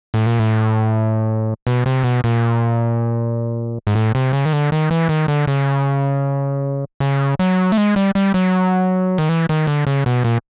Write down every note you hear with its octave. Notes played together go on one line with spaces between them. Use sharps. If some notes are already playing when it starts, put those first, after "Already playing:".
A2
A#2
A2
B2
C3
B2
A#2
G#2
A2
C3
C#3
D#3
D3
D#3
E3
D#3
D3
C#3
C#3
F#3
A3
G#3
G3
G3
F#3
D#3
E3
D#3
D3
C#3
B2
A#2